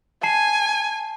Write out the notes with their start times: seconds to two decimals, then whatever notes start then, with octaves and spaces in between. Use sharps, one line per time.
0.23 G#5 A5 C7